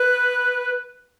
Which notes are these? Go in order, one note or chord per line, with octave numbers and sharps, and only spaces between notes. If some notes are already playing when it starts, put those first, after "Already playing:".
Already playing: B4